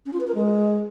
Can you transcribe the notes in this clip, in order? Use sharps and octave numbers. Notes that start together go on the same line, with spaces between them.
C#4
F4
B4
A#4
G#3